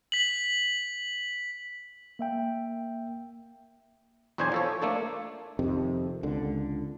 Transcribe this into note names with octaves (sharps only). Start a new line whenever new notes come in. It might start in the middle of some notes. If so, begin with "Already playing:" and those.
B6 F#7
A#3 E5 G5
B1 E2 D4 C5 C#5 G#5
F3 A4 C#5
A3 A#3 D4 A4
F2 C3 D#3
C#2 D3